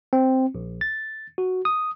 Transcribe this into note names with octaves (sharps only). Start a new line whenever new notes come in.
C4
A#1
A6
F#4
D#6